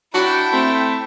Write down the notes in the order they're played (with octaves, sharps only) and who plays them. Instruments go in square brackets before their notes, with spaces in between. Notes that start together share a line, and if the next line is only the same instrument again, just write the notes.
[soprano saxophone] D4 [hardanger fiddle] E4 G5 [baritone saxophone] F#4
[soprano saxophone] A3 [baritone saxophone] C4